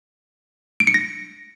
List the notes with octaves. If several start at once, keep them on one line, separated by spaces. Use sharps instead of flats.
D7
C#7
A#6